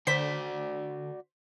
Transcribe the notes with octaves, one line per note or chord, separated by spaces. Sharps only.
D3 F#4 C5 D5 B6